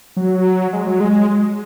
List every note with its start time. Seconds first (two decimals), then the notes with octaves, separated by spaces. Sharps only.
0.17 F#3
0.73 G#3
0.87 F#3
1.00 G#3